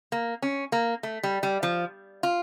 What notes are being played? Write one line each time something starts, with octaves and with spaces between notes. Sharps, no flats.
A#3
C#4
A#3
A3
G3
G3
F3
F4